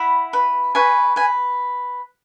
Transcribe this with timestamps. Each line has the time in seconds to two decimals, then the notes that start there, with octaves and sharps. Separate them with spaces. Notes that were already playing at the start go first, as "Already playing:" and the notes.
Already playing: E4 F#5 B5
0.33 B4
0.75 B4 G#5 C#6
1.16 B4 G#5